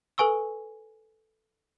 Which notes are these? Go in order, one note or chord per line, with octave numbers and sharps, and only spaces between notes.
A4 B4 G#5 C#6 E6